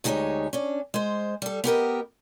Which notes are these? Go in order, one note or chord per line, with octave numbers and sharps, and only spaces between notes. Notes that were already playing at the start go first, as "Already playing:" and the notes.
D2 G#3 D#4 G4 G#4 C#5
C#4 D4
G#3 C5
G3 A4
B3 G4 A#4 D#5